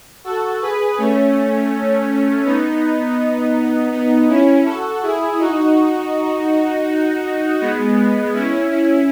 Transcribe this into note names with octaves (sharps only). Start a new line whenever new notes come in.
F#4 A4
G#4 B4
A3 C#4
B3 D#4
B3 D#4
C#4 E4
F#4 A4
E4 G#4
D#4 F#4
G#3 B3
C#4 E4
C#4 E4